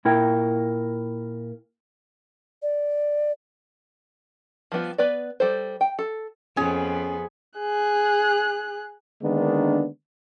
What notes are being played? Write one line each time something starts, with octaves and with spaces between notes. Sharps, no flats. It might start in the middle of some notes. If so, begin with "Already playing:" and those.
A#2 E4 A#4 G5
D5
F3 G3 B3 F4
B3 B4 D5
G3 A4 C5
G5
A4
F2 B3 C#4 G#4
G#4 F#6
D3 D#3 G#3 A#3 B3 D4